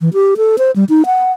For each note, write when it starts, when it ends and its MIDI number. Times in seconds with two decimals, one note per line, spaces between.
0.01 0.09 52
0.14 0.35 67
0.37 0.56 69
0.58 0.71 72
0.76 0.84 55
0.89 1.05 63
1.06 1.32 78